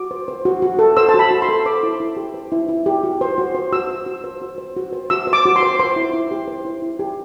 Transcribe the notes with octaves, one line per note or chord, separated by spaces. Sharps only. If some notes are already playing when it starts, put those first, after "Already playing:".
Already playing: F#4 D6
C5
C5
F#4
F#4
A4
C5 E6
A5
F#4 B5
F#4
C6
A4
C5 D6
E4
E4
G4
C5
E4
E4
G4
F#4
C5
F#4
C5
F#4 E6
C5
F#4
C5
F#4
C5
F#4
C5
F#4 E6
C5
D6
F#4
C6
C5
C5 C6
E4
E4
G4
C5
E4
E4
G4